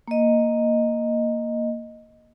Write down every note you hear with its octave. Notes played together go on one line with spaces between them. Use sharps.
A#3 D#5